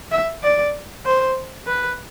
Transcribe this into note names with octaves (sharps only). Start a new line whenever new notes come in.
E5
D5
C5
B4